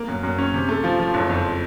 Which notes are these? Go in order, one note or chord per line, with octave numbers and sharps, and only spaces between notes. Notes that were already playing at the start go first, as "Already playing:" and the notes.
Already playing: A#3
F#2
F#2
C#4
C3
A3
F3
F3
F#1
F2